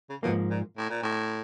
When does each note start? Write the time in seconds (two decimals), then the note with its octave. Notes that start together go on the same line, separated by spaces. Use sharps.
0.10 C#3
0.23 G#2 B2 F3 A#3
0.50 A#2
0.77 A2
0.90 A#2
1.03 A2